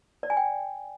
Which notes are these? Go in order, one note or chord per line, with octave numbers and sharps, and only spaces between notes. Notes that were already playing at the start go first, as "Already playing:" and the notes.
D5
G#5
G5